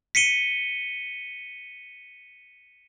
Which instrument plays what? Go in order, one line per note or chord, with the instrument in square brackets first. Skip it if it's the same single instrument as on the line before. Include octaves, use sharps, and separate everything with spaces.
[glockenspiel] B6 C#7 D#7 G7